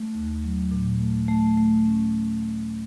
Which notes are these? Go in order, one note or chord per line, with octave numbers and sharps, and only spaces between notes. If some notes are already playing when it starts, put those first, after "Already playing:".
Already playing: A3
D#2
F#3
A#2
A3
A3
A3
C#4